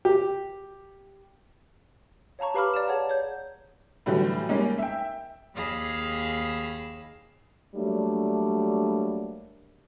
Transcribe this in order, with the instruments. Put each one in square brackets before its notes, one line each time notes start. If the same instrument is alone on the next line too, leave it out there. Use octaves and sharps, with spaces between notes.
[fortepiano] G4
[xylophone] C#5 F5 A5 A#5 C#6
G4 B4 F5 B5 D6 F6
D5 A#5 E7
G#4 C#5 F#5 A5
C#5 G6
[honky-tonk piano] A2 D3 E3 F#3 G3
G3 G#3 A#3 C#4 D#4
E5 G5
[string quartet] D#2 G#4 D#5 F5 B5 E6
[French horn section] F#3 G3 A3 A#3 D4